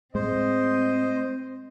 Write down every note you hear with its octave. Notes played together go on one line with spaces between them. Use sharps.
A2 G#3 C4 C5 D#5